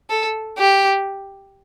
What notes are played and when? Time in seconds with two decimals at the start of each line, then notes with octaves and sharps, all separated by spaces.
0.10 A4
0.58 G4